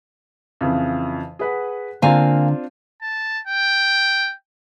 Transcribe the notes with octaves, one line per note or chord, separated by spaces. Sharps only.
F2 C#3 E3
G#4 B4 F#5
D3 A#3 C4 D4 F4 F5 G#5
A5
G5